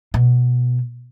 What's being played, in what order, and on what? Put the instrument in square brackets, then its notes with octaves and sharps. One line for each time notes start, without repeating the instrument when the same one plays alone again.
[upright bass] B2